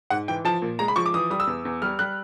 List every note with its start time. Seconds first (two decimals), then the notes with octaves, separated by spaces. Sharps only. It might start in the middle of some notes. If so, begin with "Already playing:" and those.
0.10 G#2 F#5
0.28 E3 G5
0.45 F3 A5
0.62 A#2
0.79 G#3 A#5
0.88 B5
0.96 F3 C#6
1.06 D6
1.14 E3 D#6
1.30 G3 D#6
1.40 E6
1.47 E2
1.65 E2
1.82 G3 F6
1.99 G3 F#6